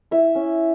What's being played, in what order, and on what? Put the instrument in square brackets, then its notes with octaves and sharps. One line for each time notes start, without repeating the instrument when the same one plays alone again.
[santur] E4 E5
C#4